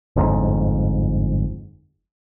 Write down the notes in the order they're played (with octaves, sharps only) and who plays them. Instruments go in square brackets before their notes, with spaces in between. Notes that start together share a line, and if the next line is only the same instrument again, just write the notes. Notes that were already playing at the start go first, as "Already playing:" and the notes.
[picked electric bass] G1 F2 G#2